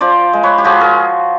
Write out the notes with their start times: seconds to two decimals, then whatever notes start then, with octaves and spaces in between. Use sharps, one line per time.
0.01 F3 C5 D5
0.33 G#3
0.43 B4 C#5
0.58 G4
0.64 F3 F#4 G#4
0.80 G#4 A#4